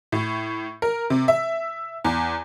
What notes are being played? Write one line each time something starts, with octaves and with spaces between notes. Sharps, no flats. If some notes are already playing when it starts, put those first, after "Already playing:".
A2
A#4
C3
E5
E2